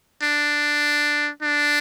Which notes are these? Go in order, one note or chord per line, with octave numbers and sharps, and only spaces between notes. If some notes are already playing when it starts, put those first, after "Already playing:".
D4
D4